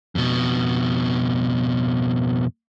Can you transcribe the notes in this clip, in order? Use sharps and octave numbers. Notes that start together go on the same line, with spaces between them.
F2 B2